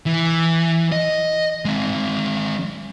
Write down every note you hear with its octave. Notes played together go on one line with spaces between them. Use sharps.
E3
D#5
G#3 C4